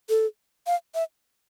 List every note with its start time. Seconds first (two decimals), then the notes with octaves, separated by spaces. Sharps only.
0.09 A4
0.67 F5
0.95 E5